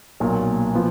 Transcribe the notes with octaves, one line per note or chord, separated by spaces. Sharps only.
B1 A#2 F#3
F3 B3